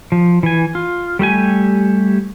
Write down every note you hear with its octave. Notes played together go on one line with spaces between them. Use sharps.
F3
E3 G#5
F4
G3 A3 G4 G#5